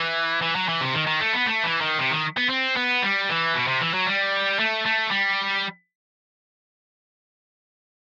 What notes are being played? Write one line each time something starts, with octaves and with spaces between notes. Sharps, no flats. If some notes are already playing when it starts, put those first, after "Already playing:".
Already playing: E3
E3
F#3
E3
C3
D#3
D#3
A3
B3
A3
E3
D#3
C3
D#3
B3
C4
B3
G3
E3
B2
C3
E3
F#3
G3
A3
A3
G3